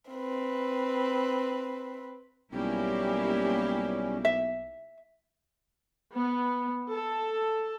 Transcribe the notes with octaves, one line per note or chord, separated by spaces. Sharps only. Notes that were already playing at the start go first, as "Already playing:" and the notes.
C4 B4
B1 G3 A#3 C#4 E4 G4
E5
B3
A4